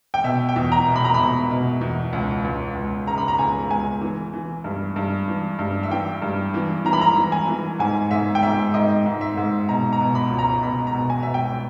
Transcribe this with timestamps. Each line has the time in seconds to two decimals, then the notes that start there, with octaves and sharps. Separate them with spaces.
0.14 G5
0.24 B2 E5
0.49 G5
0.56 E2
0.72 A#5
0.88 B2
0.96 B5
1.05 A#5
1.14 B2 B5
1.51 B2
1.81 E2
2.13 C#2
2.44 C#2
2.76 C#2
3.07 C#3 A#5
3.18 B5
3.28 A#5
3.39 C#2 G#5
3.70 C#2 G#5
4.01 E3
4.34 E3
4.64 G2
4.96 G2
5.28 E3
5.59 G2
5.83 E5
5.91 E3 G5
6.22 G2
6.54 E3
6.85 E3 A#5
6.93 B5
7.01 A#5
7.16 E3
7.32 G#5
7.49 E3
7.79 G#2 G#5
8.11 G#2 E5
8.35 G5
8.42 G#2 E5
8.74 G#2 D#5
9.06 G#2
9.21 E5
9.37 G#2
9.69 B2 A#5
9.93 A#5
10.00 B2
10.15 B5
10.31 C#2
10.39 A#5
10.62 B2 B5
10.87 A#5
10.94 B2
11.10 G#5
11.23 B2 E5
11.34 G5